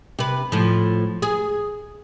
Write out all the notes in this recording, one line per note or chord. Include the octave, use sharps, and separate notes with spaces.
C3 B4
A2 F3
G#4